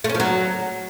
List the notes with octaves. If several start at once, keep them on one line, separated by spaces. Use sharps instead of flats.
A3
C#4
F3
F#3